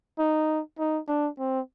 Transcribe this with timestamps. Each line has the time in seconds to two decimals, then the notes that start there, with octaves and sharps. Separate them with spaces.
0.19 D#4
0.79 D#4
1.08 D4
1.39 C4